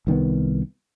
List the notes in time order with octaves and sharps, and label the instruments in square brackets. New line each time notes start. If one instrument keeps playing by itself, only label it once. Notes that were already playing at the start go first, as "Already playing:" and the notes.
[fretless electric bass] C2 D#3 G3 B3